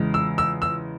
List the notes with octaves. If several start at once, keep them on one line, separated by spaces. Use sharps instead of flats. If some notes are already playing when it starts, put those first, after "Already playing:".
Already playing: E2 C#3 G#3
E6
E6
E6